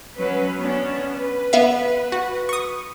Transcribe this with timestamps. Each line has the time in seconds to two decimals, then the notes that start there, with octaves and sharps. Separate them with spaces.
0.16 F#3 C#4 B4
0.59 B3 C#4 D4
1.16 B4
1.53 B3 E5 F5
2.12 F#4
2.49 C#6 D#6